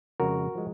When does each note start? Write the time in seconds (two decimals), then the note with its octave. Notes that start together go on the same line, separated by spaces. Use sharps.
0.20 F2 C#3 G#3 F#4 A#4
0.55 F3 G#3